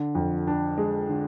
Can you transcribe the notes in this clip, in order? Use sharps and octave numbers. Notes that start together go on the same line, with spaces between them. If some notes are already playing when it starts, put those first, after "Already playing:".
Already playing: D3
F2
D4
G#3
D3